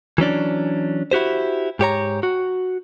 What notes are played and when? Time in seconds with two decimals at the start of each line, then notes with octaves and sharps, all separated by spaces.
0.18 E3 F#3 C#4 D4
1.11 E4 F#4 G4 C5
1.79 G#2 G4 C#5 A#5
2.23 F#4